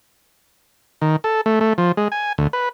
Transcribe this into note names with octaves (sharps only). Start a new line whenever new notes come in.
D#3
A4
A3
A3
F3
G#3
G#5
D2
B4